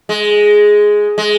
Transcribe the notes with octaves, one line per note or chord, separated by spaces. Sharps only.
G#3
G#3